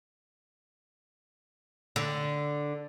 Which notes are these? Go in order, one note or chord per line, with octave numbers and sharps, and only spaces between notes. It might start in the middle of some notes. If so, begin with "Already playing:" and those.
D3